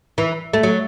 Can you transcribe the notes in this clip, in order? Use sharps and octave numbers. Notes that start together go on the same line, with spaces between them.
E3
A3
F#3